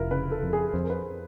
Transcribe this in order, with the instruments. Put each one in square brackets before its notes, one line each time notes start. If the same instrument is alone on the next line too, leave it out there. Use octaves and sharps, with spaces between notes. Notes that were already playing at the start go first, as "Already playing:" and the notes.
Already playing: [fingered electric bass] F1 [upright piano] E4 F4 A#4
[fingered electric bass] C#3 [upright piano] B4
[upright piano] A4
[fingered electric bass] F2
[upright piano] G#4
[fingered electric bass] F2 [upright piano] C5
[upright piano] A#4
B4